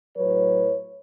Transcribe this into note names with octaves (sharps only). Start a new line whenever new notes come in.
A2 F#3 B4 C#5